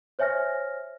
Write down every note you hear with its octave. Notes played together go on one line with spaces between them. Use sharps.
C5 C#5 E5 G#5 F6 A#6